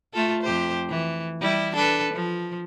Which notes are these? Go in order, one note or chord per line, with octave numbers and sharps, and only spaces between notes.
A3 F4 A4
F2 G4 C5
E3
G3 E4
D4 A4 B4
F3